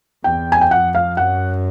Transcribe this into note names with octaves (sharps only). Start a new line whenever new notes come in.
E2 G5
G#5
G5
F2 F#5
F5
F#2 F#5